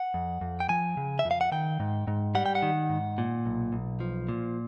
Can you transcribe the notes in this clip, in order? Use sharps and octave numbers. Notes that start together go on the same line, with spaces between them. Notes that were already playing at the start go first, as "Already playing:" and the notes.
Already playing: F#5
F2
F2
G5
F3 G#5
C#3
E5
F2
F5
F#5
D#3 G5
G#2
G#2
G3 F#5
G5
F#5
D#3
G#2
A#2
B1
B1
F3
A#2